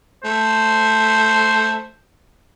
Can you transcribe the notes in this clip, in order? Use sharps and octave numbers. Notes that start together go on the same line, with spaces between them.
A3 C5